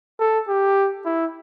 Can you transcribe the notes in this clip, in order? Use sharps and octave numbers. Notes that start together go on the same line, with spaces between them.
A4
G4
E4